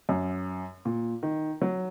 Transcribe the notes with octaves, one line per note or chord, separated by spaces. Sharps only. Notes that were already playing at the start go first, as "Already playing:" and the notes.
F#2
A#2
D#3
F#3